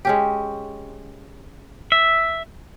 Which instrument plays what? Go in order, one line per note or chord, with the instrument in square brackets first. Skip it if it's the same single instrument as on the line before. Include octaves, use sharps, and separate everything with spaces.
[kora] G#3 C#4 G4
[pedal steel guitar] E5